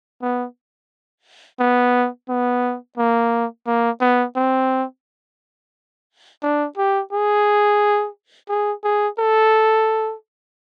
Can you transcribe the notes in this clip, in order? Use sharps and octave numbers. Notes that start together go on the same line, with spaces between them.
B3
B3
B3
A#3
A#3
B3
C4
D4
G4
G#4
G#4
G#4
A4